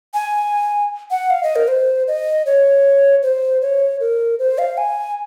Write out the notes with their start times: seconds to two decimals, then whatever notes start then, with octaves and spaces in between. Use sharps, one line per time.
0.14 G#5
1.11 F#5
1.30 F5
1.43 D#5
1.56 A#4
1.68 C5
2.08 D#5
2.46 C#5
3.23 C5
3.62 C#5
4.00 A#4
4.39 C5
4.58 F5
4.78 G#5